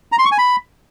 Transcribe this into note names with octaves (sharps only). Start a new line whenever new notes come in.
A#5
C6
C#6
G#5
B5